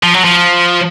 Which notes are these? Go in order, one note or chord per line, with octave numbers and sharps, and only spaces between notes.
F3
F#3
F3